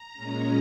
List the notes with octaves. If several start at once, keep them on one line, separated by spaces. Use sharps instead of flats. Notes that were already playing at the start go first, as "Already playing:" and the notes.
Already playing: A#5
A#2 G#3 C#4